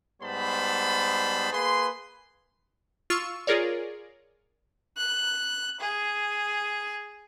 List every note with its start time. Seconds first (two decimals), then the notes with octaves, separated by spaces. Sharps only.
0.22 G#2 G3 B3 C5 A5 B5
1.52 A#3 G#4 B4 C6
3.10 F4 C#6 E6
3.47 F4 G#4 A#4 C#5 D5
4.97 F#6
5.81 G#4